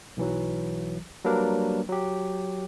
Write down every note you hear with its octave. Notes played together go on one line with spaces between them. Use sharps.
B1 E3 F#3
F#3 G3 A#3 D4 A#4 B4
F#3 G4